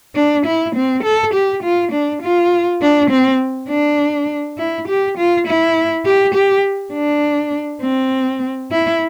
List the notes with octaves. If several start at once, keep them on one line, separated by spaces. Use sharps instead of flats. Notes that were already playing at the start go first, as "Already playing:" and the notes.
D4
E4
C4
A4
G4
F4
D4
F4
D4
C4
D4
E4
G4
F4
E4
G4
G4
D4
C4
E4